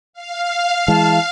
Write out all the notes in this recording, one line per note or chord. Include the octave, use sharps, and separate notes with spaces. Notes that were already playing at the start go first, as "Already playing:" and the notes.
F5
E3 G#3 A5